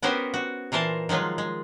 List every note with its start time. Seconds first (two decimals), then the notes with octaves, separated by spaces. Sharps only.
0.03 B3 C#4 F#4 G4 A#4 C5
0.34 F#4
0.72 A#2 E3 A#4 C5 A5
1.09 D#3 F3 F#3 G#3 F4
1.38 G#3